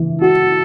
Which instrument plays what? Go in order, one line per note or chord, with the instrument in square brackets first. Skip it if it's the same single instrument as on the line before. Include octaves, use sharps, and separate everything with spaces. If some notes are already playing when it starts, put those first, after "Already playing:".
Already playing: [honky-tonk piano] E3
[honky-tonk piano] F#4 [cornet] A4